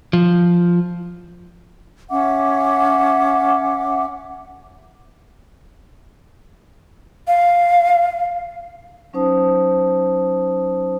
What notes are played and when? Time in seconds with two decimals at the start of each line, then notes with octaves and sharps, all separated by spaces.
0.13 F3
2.09 C#4 E5 F#5 D6
7.27 F5
9.13 F#3 C#4 D#4 C5 A5 D#6